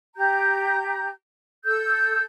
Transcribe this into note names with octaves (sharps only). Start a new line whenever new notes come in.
G4 A#5 G6
A4 E6 G6